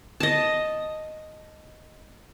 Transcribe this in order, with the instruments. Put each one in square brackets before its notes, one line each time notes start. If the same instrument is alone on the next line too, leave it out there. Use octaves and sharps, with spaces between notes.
[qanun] D#5 A5